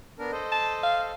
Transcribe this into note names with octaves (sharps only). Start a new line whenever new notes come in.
B3 D4 A#4
A4 C5 D#5
A5
F5